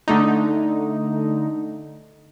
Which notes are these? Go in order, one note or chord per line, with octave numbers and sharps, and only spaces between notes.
D3 A3 D#4